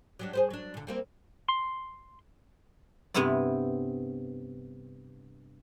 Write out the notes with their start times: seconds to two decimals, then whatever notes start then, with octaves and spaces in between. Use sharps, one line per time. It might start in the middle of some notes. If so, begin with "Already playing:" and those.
0.19 F#3 G3 D4
0.33 G#4 B4 C5
0.50 F#3 D4
0.74 A#2 D3
0.87 G3 A#3 C4
1.49 C6
3.14 G2 C3 B3 C4 E4 D5